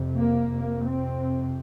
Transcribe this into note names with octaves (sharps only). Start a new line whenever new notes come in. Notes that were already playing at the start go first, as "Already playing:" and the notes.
Already playing: F2 C3
A#3
F2 C3
C4